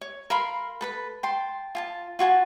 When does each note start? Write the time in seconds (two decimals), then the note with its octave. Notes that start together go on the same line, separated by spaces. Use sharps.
0.01 C#5
0.30 A#4 F5 B5 C6
0.81 A4 B4 B5
1.23 G5 A5 C6
1.75 F4 G#5 A5
2.19 F4 F#4 G#5 A5